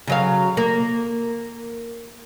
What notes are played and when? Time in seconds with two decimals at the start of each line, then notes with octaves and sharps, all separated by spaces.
0.07 C#3 F#3 F5
0.57 A#3